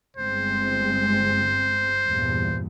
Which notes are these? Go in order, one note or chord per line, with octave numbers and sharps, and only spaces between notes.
G1 G#3 C4 C5
E2 G2 A#2